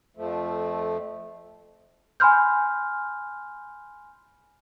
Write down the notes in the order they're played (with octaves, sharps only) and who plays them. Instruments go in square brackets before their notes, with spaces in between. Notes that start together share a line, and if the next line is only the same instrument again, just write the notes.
[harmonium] F2 F3 A3
[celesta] G#5 B5 C6 F6 G6